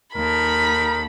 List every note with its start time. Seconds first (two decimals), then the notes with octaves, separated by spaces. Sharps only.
0.15 D#2 D#4 A4 A#4 B5